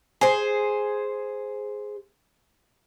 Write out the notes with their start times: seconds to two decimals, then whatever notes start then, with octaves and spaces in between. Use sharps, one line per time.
0.21 G#4 C5